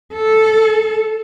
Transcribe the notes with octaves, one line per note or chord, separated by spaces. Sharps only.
A4